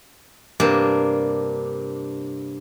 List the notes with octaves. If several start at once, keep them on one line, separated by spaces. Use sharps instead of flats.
G2 C3 A#3 D4